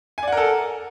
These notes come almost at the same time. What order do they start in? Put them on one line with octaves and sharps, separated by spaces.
G#5 D5 F#5 A#4 A4